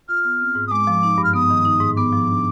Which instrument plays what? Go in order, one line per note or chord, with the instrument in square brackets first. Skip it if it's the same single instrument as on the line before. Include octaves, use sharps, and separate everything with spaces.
[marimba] F4 [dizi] F6
[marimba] B3
C4
G#2
[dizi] D#6
[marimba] G#3 [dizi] D6
[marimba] F3
D#4
G2
[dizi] F6
[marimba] B3 [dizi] D#6
[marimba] D#3
D#4
G#2
[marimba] B3 [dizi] D6
[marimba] F3
D4